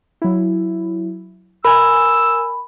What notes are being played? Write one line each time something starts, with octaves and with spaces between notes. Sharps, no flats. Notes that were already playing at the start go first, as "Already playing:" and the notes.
F#3 E4
A#4 G#5 B5 E6